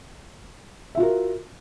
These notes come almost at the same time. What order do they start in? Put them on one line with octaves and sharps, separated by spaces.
E5 F4 F#4 A#4